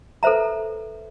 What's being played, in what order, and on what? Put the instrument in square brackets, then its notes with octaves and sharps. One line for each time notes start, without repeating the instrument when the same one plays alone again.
[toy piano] A4 B4 C5 E5 A#5